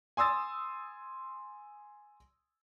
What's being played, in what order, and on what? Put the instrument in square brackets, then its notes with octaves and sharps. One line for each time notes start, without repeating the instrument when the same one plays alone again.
[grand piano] G#5 C6 D#6 E6 A6